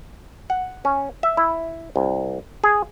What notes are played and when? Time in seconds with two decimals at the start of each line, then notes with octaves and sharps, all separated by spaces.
0.50 F#5
0.85 C#4
1.23 E5
1.37 E4
1.96 C2
2.64 G#4